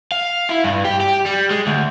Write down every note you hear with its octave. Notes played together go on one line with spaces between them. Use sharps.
F5
E4
G2
G4
G4
G3
G#3
D2